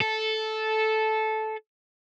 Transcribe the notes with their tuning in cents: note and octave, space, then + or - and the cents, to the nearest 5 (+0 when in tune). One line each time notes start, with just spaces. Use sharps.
A4 -10